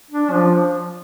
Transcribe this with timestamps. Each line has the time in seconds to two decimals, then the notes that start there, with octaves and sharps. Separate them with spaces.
0.11 D4
0.31 F3